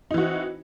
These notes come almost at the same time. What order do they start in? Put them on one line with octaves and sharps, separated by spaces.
D#4 E3 F#4 C4